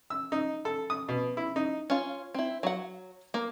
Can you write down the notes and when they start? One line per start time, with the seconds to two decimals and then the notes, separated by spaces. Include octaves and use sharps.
0.10 E6
0.32 D#4
0.65 A4
0.90 D#6
1.09 B2
1.37 E4
1.56 D#4
1.90 C#4 F4
2.34 C4 E4
2.63 F#3 F#5
3.34 A#3